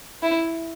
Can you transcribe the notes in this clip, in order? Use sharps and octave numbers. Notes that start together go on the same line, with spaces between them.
E4